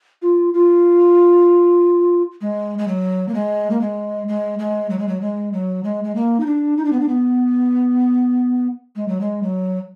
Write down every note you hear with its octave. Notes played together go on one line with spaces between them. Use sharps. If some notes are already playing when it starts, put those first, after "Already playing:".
F4
F4
G#3
G#3
F#3
A#3
G#3
A#3
G#3
G#3
G#3
F#3
G#3
F#3
G#3
F#3
G#3
G#3
A#3
D#4
D4
D#4
D4
B3
D4
B3
G#3
F#3
G#3
F#3